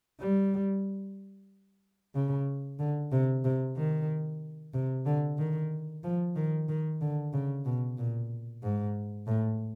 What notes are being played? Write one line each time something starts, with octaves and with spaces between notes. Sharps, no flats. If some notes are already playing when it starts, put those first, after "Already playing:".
G3
C#3
D3
C3
C3
D#3
C3
D3
D#3
F3
D#3
D#3
D3
C#3
B2
A#2
G#2
A2